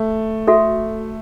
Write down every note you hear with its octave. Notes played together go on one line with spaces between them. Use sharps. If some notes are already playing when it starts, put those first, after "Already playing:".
Already playing: A3
F#4 A4 E5